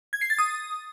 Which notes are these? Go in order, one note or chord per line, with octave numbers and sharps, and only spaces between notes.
G#6
C7
A6
D#6